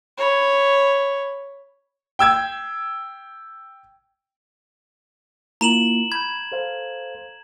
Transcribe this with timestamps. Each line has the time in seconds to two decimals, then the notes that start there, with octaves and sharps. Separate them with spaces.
0.17 C#5 B5
2.19 G5 E6 G#6
5.61 A#3 E4 F4 A#5 E7 F#7
6.12 B5 G6 G#6
6.52 A4 C5 F5